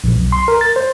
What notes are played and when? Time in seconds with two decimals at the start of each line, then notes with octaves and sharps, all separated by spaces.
0.04 A#1
0.16 B1
0.32 C6
0.48 A#4
0.61 A6
0.76 C5